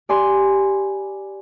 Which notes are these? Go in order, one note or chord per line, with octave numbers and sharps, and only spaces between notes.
G4 D5 G#5 B5 C6